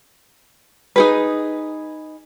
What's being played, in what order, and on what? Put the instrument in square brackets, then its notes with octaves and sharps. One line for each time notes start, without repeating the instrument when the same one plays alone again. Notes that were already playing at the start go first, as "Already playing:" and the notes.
[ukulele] D#4 G#4 B4